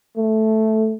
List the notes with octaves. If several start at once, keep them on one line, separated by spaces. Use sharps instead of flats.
A3